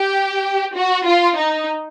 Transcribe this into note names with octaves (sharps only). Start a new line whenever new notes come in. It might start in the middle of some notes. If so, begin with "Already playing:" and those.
Already playing: G4
F#4
F4
D#4